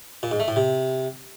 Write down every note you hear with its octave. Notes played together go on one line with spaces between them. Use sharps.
A#2
G#2
A3
A2
C3